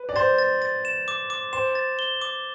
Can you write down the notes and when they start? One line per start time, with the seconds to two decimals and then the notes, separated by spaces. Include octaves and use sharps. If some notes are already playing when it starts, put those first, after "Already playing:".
Already playing: B4
0.09 D5
0.16 C5 A6
0.39 A6
0.62 A6
0.85 E7
1.08 D6
1.30 D6
1.53 C5 E7
1.75 A6
1.99 G7
2.21 D6